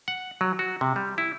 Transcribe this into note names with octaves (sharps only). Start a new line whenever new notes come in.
F#5
F#3
F#4
C3
G3
E4